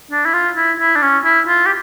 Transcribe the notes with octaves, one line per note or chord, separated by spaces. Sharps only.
D4
E4
F4
E4
E4
D4
C#4
E4
F4
G4